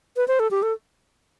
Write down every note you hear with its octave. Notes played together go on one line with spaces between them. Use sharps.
B4
C5
A4
G4
A4